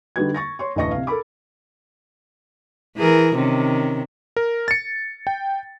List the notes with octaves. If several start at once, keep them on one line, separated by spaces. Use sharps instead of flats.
D3 G3 D#4 F#4 B4 G#6
C#6 A6 A#6
C#5 C6 C#6
A1 D2 B4 D#5 C#6 A#6
C3 F5
A4 A#4 B5 D6
E3 G#4 A#4
C3 D#3 C#4
A#4
A6 C#7
G5